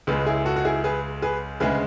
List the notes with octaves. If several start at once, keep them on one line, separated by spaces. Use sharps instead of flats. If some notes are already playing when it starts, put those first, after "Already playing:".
C#2 C#3 G#3 G#4 B4
E4 G#4
F#4 A4
F#4
E4 G#4
G#4 B4
G#4 B4
D2 C#3 G#3 G#4 B4